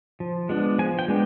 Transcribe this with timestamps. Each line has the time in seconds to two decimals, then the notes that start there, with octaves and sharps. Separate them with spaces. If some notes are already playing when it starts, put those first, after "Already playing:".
0.20 F3
0.49 G#3 B3 D4
0.79 F3 G#5
0.99 G5
1.08 G#3 B3 D4